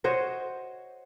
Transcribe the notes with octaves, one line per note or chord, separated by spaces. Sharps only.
F#4 C5 C#5 D#5